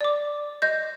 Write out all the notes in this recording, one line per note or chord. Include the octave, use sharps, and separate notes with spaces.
D5 D6
D#5 G6